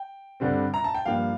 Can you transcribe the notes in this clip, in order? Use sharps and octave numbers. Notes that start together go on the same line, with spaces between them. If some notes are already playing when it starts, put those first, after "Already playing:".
Already playing: G5
G2 D3 G3 C4
A#5
A5
G5
G2 F3 A#3 F5